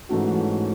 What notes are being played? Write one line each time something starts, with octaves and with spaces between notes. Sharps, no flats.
G#2 E3 A3 C#4 F#4